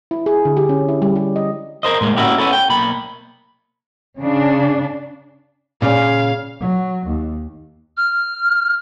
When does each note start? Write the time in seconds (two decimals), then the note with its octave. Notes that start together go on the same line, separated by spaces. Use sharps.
0.11 E4
0.26 G#4
0.45 D3
0.57 G4
0.69 C#4
0.89 E4
1.02 G3
1.16 G4
1.36 D#5
1.83 A#4 C5 D#5
2.01 A2 G#3 A#3
2.17 A#3 C#4 E4 F#4 G4
2.38 B3 C#4 E4 A4
2.53 G5
2.70 B1 A#3 B5
4.19 C#3 D4
5.82 A#2 C#3 C#4 F5
6.60 F#3
7.06 D#2
7.97 F6